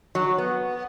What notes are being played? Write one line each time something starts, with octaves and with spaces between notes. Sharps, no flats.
F#3
B3